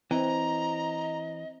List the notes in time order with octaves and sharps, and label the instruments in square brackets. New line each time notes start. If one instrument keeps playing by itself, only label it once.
[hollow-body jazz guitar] E3 [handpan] C4 [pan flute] D#5 [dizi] A#5